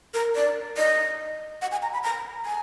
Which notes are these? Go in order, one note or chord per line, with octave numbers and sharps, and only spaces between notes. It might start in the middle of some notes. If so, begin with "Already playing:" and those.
A#4
D5
D#5
F#5
G#5
A#5
B5
A#5
G#5